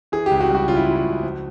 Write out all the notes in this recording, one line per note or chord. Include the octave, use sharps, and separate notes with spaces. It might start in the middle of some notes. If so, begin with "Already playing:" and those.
E3 G#4
G4
C#2
F#4
G3
F#4
C#3 F4
E4
E3 F4
F#4
C#2
F3